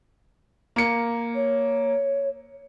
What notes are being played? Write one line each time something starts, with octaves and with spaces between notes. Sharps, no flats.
A#3 C#7
C#5